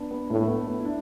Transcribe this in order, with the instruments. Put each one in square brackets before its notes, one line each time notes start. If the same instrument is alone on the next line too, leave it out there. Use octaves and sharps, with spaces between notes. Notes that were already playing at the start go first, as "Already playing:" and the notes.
Already playing: [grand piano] B3 D4
B3
[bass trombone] A2 [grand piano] A3
[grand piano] A3
B3
B3
E4
D4